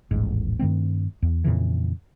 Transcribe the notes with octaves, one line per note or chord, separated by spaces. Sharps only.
D#1 A1 G#2
G2 D#3 A3 C4
E2
F2 A#2 C#3 E3